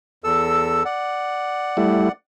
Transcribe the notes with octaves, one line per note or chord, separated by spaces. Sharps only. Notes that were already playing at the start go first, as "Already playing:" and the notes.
E2 A4 E6
D5 F#5
G3 A3 E4